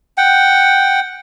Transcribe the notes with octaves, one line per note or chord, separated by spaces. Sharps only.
F#5 G5